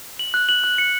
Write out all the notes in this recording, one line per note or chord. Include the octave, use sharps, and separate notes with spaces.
F#7
F#6
F#7
F#6
C#7